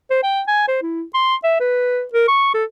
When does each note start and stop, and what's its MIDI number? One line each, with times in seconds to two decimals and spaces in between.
0.10 0.22 72
0.23 0.42 79
0.47 0.64 80
0.68 0.79 72
0.82 1.02 64
1.14 1.35 84
1.44 1.55 76
1.60 2.04 71
2.13 2.25 70
2.28 2.50 85
2.54 2.64 69